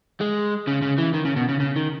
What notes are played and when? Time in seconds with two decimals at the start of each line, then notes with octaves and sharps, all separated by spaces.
0.21 G#3
0.67 C#3
0.82 C#3
0.98 E3
1.14 D#3
1.25 C#3
1.36 B2
1.49 C#3
1.60 C#3
1.76 D#3